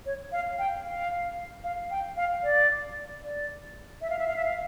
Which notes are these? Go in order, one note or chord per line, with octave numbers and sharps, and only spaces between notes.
C#5
F5
G5
F5
F5
G5
F5
D5
D5
E5
F5
E5
F5
E5
F5